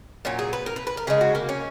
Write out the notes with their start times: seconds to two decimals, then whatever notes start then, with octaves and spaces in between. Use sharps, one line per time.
0.25 A#2 F#3 C#4
0.39 G#4
0.53 B4
0.66 A#4
0.76 B4
0.87 B4
0.97 A#4
1.07 C#3 G#3 G#4
1.21 F#4
1.35 A#3
1.49 C#4